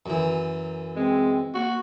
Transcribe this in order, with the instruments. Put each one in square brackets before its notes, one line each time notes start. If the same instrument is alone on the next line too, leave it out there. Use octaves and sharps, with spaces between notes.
[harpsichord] F#2 E3
[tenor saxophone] G#3 [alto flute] C4
[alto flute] A#3 [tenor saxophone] F#4